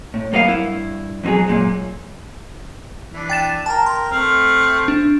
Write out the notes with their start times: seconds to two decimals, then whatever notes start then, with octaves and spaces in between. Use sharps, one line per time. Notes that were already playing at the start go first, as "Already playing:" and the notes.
0.14 A2
0.33 F#2 A#3 B3 F#4 F5
0.48 G2 E4
1.24 F2 B2 D3 F#3 G#4
1.48 F#2 A#2 G#3
3.13 E3 D4
3.30 G5 A6 E7
3.66 A#4 G5 A5 A#5
3.86 C6
4.11 A3 C4 F6
4.88 D4